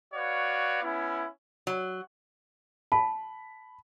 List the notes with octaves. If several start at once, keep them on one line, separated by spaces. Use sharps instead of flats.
F#4 B4 C#5 D5 F5
B3 C#4 E4
F#3
A5 B5